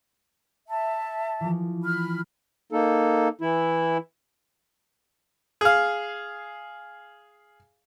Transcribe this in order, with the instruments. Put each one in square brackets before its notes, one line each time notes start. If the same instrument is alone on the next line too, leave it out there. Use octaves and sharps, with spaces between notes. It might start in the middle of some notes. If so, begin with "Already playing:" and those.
[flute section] E5 A5
[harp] E3 F3
[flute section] B5 F6
[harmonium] A#3 D#4 A4
E3 E4
[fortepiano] G#4 F5